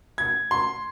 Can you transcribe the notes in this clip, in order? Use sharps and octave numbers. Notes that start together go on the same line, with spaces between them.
G#6
C6